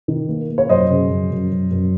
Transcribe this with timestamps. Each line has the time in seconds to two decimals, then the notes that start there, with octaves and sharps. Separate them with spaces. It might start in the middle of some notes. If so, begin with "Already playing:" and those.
0.08 D#3
0.28 A#3
0.50 A#3
0.58 C#5
0.69 F#2 C5 D#5
0.90 C#3
1.10 F#2
1.31 F#2
1.51 F#2
1.71 F#2